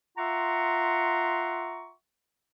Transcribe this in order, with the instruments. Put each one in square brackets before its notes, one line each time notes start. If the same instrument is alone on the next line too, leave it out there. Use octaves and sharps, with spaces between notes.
[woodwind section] F4 E5 F#5 A#5 C6 C#6